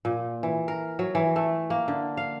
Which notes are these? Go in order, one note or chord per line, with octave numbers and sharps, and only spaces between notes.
A#2
E3
A#4
F#3
E3
A3
A#3
D3
F5